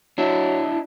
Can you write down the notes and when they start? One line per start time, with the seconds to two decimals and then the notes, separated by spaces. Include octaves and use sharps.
0.18 F#3 D4 E4